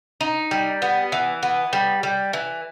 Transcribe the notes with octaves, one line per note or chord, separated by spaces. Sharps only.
D#4
G3
B3
E3
B3
G3
G3
E3